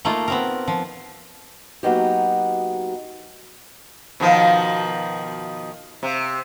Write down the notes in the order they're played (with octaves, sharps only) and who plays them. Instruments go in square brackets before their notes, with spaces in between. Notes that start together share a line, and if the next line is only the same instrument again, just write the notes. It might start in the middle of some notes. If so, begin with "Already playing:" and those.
[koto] A3 A#3 D#4 F4
B3 C4 A#4
F3
[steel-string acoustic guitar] F#3 A#3 B3 D#4 F#4 G4
[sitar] B2 D#3 F3
C3